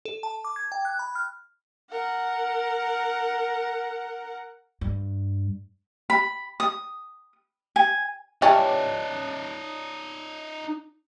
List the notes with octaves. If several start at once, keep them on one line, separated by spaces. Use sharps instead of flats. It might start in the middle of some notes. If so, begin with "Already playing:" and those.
A4
A5
D6
G#6
G5
F#6
B5
F6
A#4 F#5
G2
B5
D#6
G#5
E3 G3 C#4 D#4 C#5 D5 A5